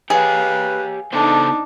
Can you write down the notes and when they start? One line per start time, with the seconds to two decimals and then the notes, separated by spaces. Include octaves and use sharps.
0.10 G4 G#4 B4 C#5 F5 G5
1.13 C#3 B3 D4 D#4 A4 C5